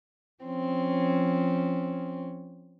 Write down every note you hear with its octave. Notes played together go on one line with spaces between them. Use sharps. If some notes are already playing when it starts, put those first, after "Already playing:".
F3 C4 C#4